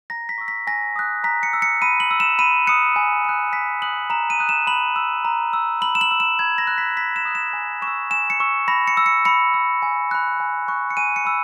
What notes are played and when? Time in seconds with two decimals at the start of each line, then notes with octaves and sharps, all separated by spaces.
0.10 A#5 A#6
0.29 B6
0.38 C#6 E6
0.48 B6
0.67 G#5 A#6
0.96 D#6 F#6
1.24 A#5 B6
1.43 C#7
1.53 E6
1.62 C#7
1.82 B5 D#7
2.00 F#7
2.11 E6
2.20 E7
2.39 B5 D#7
2.67 D#6 F#6 C#7
2.96 G#5
3.24 D#6 F#6
3.53 G#5 B6
3.82 D#6 F#6 F#7
4.10 A#5 E7
4.30 D#7
4.39 D#6 F#6
4.49 E7
4.67 B5 F#7
4.96 E6
5.25 A#5
5.53 E6
5.82 B5 F#7
5.95 E7
6.01 F#7
6.11 E6
6.20 E7
6.39 B5 G#6
6.58 A#6
6.67 F#6
6.78 B6
6.97 B5 B6
7.16 E7
7.25 D#6 F#6
7.35 E7
7.53 G#5
7.82 C#6 E7
7.87 E6
8.11 G#5 E7
8.30 C#7
8.40 C#6 E6
8.68 B5 A#6
8.87 C#7
8.97 E6
9.06 C#7
9.25 B5 C#7
9.54 E6
9.82 G#5
10.11 B5 F#6
10.40 G#5
10.68 C#6 F#6
10.90 C#7
10.97 G#5 D#7
11.16 C#7
11.25 B5 E6